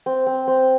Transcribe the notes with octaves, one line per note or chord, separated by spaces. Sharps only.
C4
C4
C4